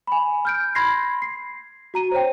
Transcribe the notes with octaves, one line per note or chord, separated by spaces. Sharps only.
G#5 B5
F6 G6 D7
B5 C6 G#6 A#6 C7
C7
F#4 A#5 D#7
C5 C#5 G5